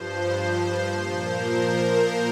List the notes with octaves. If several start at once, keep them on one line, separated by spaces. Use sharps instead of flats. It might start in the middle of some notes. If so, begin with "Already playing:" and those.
Already playing: G2 F3 C5
C5
A#2 F3 C5
A#4
C5